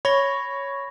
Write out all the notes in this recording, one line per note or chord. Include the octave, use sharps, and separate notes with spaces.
C#5 B5 C#6 A#6